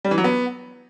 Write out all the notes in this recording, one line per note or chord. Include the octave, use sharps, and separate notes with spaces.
G3
E3
F#3
B3